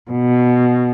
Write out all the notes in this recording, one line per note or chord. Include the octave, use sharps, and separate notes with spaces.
B2